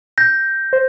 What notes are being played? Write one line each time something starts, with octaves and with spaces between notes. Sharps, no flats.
G6 A#6
C5